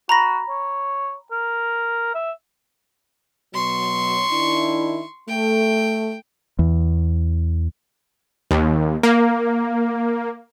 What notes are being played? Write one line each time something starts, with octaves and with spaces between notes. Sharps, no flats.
F#4 A#5 B5 A#6
C#5
A#4
E5
B2 F#3 C6 C#6
D#3 D4 E4
A3 G5
E2
D#2
A#3